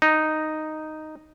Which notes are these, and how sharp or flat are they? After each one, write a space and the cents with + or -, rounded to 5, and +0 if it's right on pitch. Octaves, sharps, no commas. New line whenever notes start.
D#4 -5